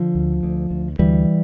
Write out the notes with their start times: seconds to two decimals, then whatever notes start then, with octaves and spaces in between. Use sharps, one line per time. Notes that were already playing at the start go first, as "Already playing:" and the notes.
Already playing: D3 F3
0.15 D2
0.43 D2
0.70 D2
0.99 D2 E3 G3